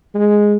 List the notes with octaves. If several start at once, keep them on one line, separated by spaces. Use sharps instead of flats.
G#3